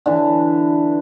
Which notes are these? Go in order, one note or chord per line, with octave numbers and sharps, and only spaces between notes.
D3 E3